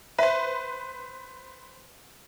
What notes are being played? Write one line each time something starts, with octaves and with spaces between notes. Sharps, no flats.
B4 C5 E5